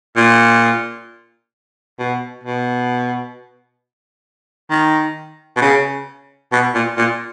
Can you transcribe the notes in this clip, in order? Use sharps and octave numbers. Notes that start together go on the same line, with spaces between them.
A#2
B2
B2
D#3
B2
C#3
B2
A#2
A#2